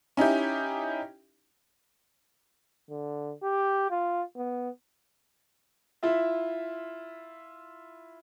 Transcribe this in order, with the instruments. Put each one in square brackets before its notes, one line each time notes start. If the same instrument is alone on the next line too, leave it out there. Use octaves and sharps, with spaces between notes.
[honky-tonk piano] C#4 D#4 E4 G4
[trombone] D3
G4
F4
B3
[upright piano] E4 F4 E5